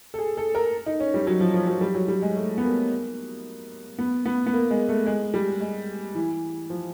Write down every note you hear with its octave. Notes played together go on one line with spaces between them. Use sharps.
A4
G#4
A4
A#4
D#4
C#4
G3
F#3
F3
F3
F#3
G3
F#3
G3
G#3
A3
B3
A#3
B3
B3
B3
A#3
G#3
A3
G#3
G3
G#3
E3
F3